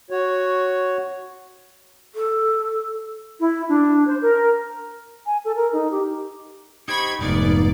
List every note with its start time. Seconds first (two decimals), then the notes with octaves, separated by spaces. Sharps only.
0.10 F#4 C#5
2.14 A4
3.41 E4
3.69 D4
4.07 C5
4.21 A#4
5.26 G#5
5.45 A4
5.56 A#4
5.73 D#4
5.91 G4
6.88 D#4 G4 C5 B5 C#6 G#6
7.21 F1 G#2 B3 D#4 F4 D5